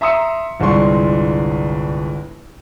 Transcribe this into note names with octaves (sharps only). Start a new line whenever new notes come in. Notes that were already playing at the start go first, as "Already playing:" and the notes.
E5 A#5 C6 D#6 E6 C#7
G1 C2 G#3 D4 C6 C#6